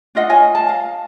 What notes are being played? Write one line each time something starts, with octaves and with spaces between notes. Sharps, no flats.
D4 F4 D#5 F#5
F4 C#5 D#5 G#5
A5
F5